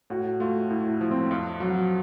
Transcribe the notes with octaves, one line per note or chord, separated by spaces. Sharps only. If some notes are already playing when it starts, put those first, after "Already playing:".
A2 F#4
A3 F4
A2 E4
E4
F3
C4
F2 F4
F#3 F#4